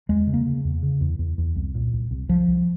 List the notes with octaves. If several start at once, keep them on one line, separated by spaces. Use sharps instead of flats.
E2 G#3
C#3
A#3
C#3
E2
C#3
E2
E2
E2
C2
A#2
C2
C2
C2 F3
C2